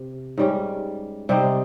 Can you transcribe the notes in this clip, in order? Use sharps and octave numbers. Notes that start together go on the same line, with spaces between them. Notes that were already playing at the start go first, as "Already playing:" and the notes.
Already playing: C3
G#2 G3 C#4
C3 G3 C4 D#4